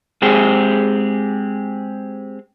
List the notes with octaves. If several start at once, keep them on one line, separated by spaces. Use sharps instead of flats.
G#3 C4 G4 G#4